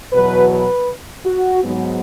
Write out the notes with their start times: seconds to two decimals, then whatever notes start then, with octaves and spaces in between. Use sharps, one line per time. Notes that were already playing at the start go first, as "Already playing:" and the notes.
0.13 E2 B2 F#3 B4
0.51 B4
1.26 F#4
1.64 G#2 F#3 B3